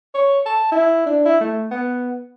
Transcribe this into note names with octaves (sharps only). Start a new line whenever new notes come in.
C#5
A5
E4
D4
E4
A3
B3